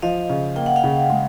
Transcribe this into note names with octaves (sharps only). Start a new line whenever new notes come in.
F3 D#5 F5
C#3
A#3 G5
F#5
F5 G5
C#3
G#3